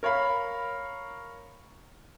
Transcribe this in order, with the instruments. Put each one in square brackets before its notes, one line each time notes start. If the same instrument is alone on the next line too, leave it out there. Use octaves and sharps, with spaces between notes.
[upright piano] A#4 C#5 F5 B5